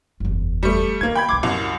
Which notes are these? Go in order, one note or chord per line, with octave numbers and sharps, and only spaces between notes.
F#1 E2
G3 A3
D#3 A#3 G#6
G5 B5 G#6
C#2 D3 D6 G#6
C2 F#2 B3